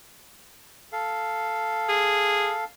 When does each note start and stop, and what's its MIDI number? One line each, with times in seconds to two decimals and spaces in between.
0.92 2.64 69
0.92 2.64 77
1.89 2.53 68